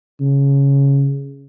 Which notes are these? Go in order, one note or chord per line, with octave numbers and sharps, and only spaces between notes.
C#3